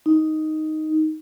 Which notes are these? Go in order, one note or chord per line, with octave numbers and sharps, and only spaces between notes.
D#4